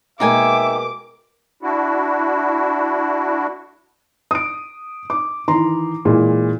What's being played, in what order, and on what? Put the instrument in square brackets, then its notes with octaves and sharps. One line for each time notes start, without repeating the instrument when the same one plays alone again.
[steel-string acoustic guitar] B2 G#3 A#3 [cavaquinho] D#4 G5 G#5 [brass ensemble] E5 [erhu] D6
[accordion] D4 E4 F#4
[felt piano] D#6 D7
D6
D#3 E3 A#5 C6
A#2 E3 G#3